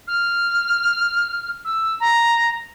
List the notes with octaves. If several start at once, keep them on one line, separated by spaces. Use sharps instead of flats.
F6
E6
A#5